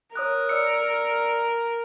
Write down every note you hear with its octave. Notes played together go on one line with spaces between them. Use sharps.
A#4 C#5 D#6 F#6
D5 E6 C#7